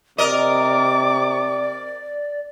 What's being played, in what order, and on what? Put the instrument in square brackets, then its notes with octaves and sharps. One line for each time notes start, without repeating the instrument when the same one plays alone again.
[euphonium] C3 [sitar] A#4 D#5 [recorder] D5 [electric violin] D6